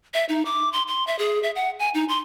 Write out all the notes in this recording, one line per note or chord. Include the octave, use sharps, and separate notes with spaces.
E5
D#4
D6
C6
C6
E5
G#4
E5
F#5
G#5
D#4
C6